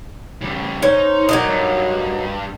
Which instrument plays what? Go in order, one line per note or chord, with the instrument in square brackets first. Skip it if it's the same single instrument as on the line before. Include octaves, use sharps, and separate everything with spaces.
[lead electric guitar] C#3 G3
[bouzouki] C#4 C5 [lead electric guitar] D#4
[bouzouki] F#3 A#3 D#4 [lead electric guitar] C5 D5
[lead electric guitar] G2